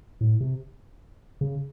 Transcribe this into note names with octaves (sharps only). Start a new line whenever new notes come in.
A2
C3
C#3